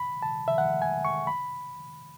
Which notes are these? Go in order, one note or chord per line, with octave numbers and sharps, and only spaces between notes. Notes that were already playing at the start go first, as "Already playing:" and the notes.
Already playing: B5
A5
E5
F#5
G#5
C#6
B5